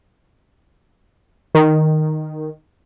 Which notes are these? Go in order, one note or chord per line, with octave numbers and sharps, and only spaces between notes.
D#3